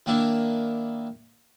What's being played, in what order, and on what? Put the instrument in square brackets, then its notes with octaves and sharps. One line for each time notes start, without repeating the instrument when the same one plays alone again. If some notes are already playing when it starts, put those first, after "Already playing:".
[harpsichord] D#3 A#3 D4 E4